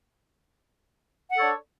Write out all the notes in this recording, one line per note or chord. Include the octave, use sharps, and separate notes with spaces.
D4 A4 C#5 F#5